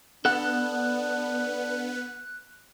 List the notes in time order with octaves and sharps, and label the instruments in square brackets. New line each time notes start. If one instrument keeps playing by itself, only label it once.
[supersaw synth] B3 [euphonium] D4 [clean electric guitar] A4 F#5 [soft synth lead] F#6